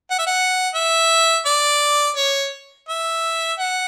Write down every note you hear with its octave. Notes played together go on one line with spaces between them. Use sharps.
F#5
E5
F#5
E5
D5
C#5
E5
F#5